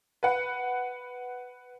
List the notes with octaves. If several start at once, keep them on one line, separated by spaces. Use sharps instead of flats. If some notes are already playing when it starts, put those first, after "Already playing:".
B4 F#5